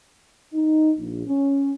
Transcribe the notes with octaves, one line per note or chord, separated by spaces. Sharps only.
D#4
A#1
C#4